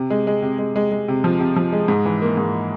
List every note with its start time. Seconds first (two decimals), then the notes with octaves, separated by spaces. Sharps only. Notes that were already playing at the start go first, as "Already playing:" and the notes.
Already playing: C3
0.10 G#3
0.27 G#3
0.42 C3
0.59 G#3
0.76 G#3
0.92 G#3
1.08 C3
1.24 F3
1.40 C3
1.56 F3
1.72 G#3
1.88 G#2
2.05 E3
2.22 A#3
2.37 G#2